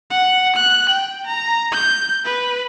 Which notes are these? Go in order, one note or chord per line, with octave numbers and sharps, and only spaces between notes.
F#5
F#6
G5
A#5
G6
B4